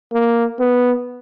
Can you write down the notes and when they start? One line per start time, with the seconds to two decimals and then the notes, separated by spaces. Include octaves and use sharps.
0.13 A#3
0.60 B3